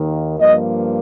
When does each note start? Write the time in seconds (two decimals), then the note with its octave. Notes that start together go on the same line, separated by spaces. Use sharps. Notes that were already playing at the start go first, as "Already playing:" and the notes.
Already playing: D#2 D#3 A#3
0.38 G2 F3 A#3 D#5